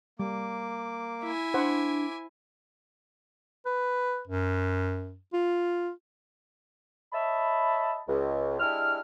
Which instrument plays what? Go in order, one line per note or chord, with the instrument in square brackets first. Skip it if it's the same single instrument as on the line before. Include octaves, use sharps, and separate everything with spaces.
[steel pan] G3 [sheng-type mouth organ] A#3 D6
[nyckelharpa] E4 G#5
[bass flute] D4 [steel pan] C5 F#5 [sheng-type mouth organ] D6
[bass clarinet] B4
F#2
F4
[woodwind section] C#5 D#5 E5 A5 B5
C#2
G#3 D4 E4 G4 F6